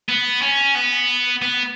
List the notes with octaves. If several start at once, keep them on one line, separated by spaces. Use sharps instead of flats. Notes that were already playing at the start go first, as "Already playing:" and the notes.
B3
C#4
B3
B3